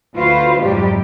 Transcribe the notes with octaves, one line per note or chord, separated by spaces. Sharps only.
D2 F4 F#4 B4 C5 F5
F2 G#2 C3 F#3 G3 G4